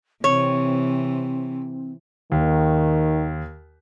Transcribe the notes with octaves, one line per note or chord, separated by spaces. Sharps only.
C3 E3 C4 C#5
D#2 D#3